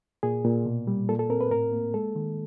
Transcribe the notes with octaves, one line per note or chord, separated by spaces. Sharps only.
A#2 G#4
A#2
B2
G3
A#2 A4
A4
C4 A#4
B4
A2 A#4
A#3
G#3 A4
D#3